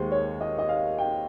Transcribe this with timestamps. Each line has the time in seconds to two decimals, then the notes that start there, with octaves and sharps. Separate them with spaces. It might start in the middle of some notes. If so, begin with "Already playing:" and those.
Already playing: D#2 D#3 G#3 C5
0.12 C#5
0.41 D#5
0.59 D#5
0.69 F5
0.98 G5